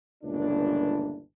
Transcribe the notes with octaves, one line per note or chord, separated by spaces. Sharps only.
G1 C#2 A#2 E3 D4